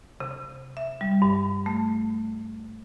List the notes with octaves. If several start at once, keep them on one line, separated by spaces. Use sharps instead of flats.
C3
E5
G3
G2
A3